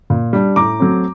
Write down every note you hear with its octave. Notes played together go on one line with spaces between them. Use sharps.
A#2
G3 D4
A2 A#5 D6
F#3 A3 C4